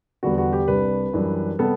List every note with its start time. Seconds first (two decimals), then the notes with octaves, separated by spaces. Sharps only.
0.23 E2 D3 G3 B3 F#4
0.38 F#4
0.53 G4
0.68 C2 C3 G3 D4 B4
1.13 F#2 E3 G3 D4
1.59 C3 G3 B3 A4